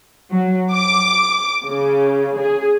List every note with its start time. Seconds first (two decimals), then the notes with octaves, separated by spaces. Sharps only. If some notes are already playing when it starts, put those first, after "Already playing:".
0.33 F#3
0.74 D6
1.67 C#3
2.38 G#4